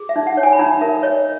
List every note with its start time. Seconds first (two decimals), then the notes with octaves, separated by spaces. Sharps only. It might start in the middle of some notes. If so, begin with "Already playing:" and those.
Already playing: G#4
0.09 E5
0.16 D#4
0.27 F#5
0.37 C#5
0.43 G#5
0.53 B5
0.59 D#4 A#5
0.81 A#4 E5
1.03 C#5 D#5